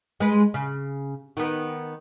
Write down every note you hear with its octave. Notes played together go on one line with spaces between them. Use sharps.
G#3 B4
C#3
D#3 B3